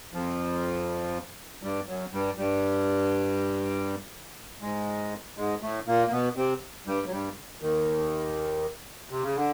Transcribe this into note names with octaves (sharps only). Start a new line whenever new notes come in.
F2 F3
G2 G3
F#2 F#3
G2 G3
G2 G3
G#2 G#3
G#2 G#3
A2 A3
A#2 A#3
A#3
B2 B3
C3 C4
G2 G3
F#3
G2 G3
D#2 D#3
C3
C#3
D3